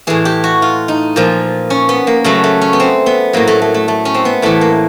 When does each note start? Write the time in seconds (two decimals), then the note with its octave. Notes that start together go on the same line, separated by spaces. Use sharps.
0.07 A2 E3 G#4
0.25 G4
0.44 F#4
0.62 F4
0.88 D#4
1.16 A#2 F3
1.70 C#4
1.89 B3
2.07 A#3
2.24 C#3 F#3 A3
2.44 A3
2.61 C#4
2.73 B3
2.80 C4
3.06 B3
3.33 A2 F#3 A#3
3.47 A3
3.62 A3
3.74 A3
3.88 A3
4.05 C#4
4.14 C4
4.25 B3
4.42 A2 E3 A3
4.61 A#3